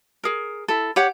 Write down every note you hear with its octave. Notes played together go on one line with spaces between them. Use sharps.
G#4 A#4
E4 A4
G4 C#5 F#5